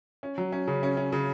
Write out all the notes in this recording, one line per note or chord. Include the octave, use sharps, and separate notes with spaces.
C#4
F#3
C#4
C#3
C#4
C#4
C#3